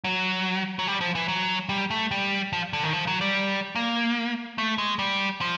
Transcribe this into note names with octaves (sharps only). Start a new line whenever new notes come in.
F#3
F#3
G3
F3
E3
F#3
G3
A3
G3
F3
D3
D#3
F3
F#3
G3
A#3
A3
G#3
G3
F3